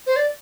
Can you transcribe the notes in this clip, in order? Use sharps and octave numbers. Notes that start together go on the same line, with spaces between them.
C5
D5